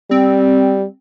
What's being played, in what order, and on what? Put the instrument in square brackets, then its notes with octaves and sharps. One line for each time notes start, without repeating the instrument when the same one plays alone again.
[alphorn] G3 [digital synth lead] C4